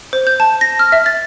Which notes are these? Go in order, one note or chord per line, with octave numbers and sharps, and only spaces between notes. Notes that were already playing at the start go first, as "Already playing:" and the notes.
C5
G6
A5
A#6
F6
E5
A6